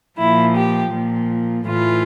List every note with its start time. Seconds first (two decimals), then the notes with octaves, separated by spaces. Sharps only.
0.18 A#2 F3 E4
0.55 G4
0.92 A#2 F3
1.66 A2 E3 F4